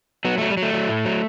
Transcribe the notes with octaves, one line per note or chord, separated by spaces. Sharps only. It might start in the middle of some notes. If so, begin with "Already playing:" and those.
F#3 B3
F#3 A3
G3
F#3
A3
F#3
A2
F#3